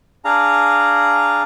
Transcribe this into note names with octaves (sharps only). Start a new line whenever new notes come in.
D4 G#4 F5 A#5